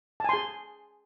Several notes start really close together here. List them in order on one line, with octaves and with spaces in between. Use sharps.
A5 G#5 C6 G#4